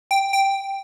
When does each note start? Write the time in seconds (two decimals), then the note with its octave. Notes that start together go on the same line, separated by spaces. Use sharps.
0.11 G5
0.33 G5